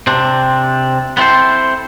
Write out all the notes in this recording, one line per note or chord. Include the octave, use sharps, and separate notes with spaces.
C3 C4 D4
B3 C4 E4 A4 C5